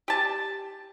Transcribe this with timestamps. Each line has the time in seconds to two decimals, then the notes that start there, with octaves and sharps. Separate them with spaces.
0.08 G4 A5